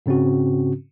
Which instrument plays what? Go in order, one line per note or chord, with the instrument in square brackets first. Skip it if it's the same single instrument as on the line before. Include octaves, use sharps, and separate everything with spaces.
[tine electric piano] G#2 C#3 C4 C#4 F#4